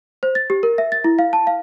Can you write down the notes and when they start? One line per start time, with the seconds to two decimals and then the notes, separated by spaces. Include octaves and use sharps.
0.23 C5
0.35 A6
0.50 G4
0.63 A#4
0.78 E5
0.92 A6
1.04 E4
1.19 F5
1.33 A5
1.47 F5